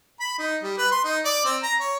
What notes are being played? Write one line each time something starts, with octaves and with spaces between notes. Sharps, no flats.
B5
D#4
G3
B4
C6
D#4
D5
C4
A#5
C#5